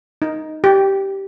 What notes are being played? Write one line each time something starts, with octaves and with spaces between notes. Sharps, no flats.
D#4
G4